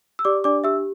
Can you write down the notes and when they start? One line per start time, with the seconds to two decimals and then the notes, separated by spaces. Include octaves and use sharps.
0.19 E6
0.25 G4 D5 D6
0.44 D4 D5 D6
0.64 G4 E5 E6